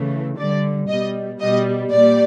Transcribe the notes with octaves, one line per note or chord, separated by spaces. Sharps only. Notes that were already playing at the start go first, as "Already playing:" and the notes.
Already playing: C#3 E3 A3
D3 G3 D5
B2 G3 D#5
B2 G3 D#5
A#2 G3 D5